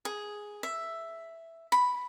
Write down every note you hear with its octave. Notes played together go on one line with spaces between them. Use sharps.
G#4
E5
B5